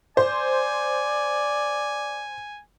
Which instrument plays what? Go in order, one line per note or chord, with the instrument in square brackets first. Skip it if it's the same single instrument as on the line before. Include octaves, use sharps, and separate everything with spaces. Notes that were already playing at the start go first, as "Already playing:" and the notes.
[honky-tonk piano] C5 [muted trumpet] D5 [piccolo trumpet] G#5